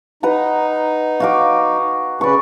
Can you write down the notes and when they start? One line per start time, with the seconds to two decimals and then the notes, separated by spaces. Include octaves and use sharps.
0.23 D#4 B4 F#5 A#5
1.20 F#4 F5 D6
2.21 C#3 C#4 B4 D5 C#6